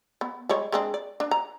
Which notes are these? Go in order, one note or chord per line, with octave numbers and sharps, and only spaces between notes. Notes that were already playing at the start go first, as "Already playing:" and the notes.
B3
G3 G#3 C#5
G#3 C4 D4
D5
D4
A#5